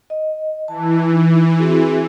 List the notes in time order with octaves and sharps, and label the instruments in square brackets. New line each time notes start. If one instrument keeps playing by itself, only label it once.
[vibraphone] D#5
[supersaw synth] E3 [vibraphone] A5
[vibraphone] D#4
C4 F#4 G#4